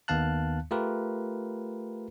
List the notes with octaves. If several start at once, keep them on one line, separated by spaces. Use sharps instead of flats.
D#2 D#3 B3 F5 A5 F#6
A3 F4 G4 A#4 B4